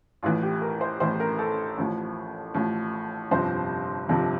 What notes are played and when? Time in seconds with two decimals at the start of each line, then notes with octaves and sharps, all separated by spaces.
0.23 A1 A2 E3 F4
0.43 G4
0.62 A#4
0.81 C5
1.00 A1 A2 E3 C5
1.20 A#4
1.39 A4
1.78 A1 A2 F3
2.54 A1 A2 F3
3.31 G1 F2 C3 F3 C5
4.08 G1 F2 C3 F3